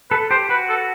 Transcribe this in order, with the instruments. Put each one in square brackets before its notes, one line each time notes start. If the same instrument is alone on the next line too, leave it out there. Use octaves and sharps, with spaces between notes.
[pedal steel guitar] A4 [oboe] B4
[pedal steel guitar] G4 [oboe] C5
[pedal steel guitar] F#4 [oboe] B4
[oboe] A4